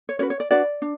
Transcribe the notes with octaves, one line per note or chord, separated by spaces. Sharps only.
C#5
C#4 F#4 B4 C#5
C#5
D5
D4 F#4 B4 D5
D4